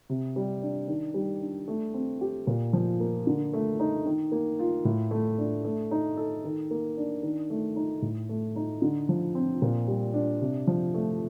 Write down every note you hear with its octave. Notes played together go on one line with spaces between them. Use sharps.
C3
G3
D4
D#3
G3
D4
A3
C4
G4
A#2
F3
A#3
D3
A3
D#4
D#3
A#3
F4
A2
A3
D4
A3
D#4
A4
D#3
A#3
D4
D#3
A3
D#4
A2
A3
D#4
D3
F3
C4
A#2
G3
D4
C3
F3
A3